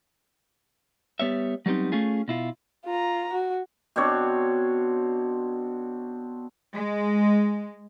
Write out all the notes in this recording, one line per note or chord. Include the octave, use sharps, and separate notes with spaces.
G3 B3 C#5 E5
F#3 G3 B3 C4 D#4
A3 C#4 F4 G#4
B2 E4 F4
F4 A#5
F#4
B2 C4 D4 C#5
G#3